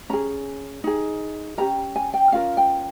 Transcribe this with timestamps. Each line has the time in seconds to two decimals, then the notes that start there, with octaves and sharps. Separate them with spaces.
0.10 C#4 G#4 A#5
0.84 D#4 G#4
1.58 C#4 G4 A#4 A#5
1.96 G#5
2.14 G5
2.32 C#4 F4 A#4 F5
2.57 G5